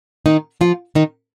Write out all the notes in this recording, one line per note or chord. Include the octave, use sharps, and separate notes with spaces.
D#3 D#4
F3 F4
D#3 D#4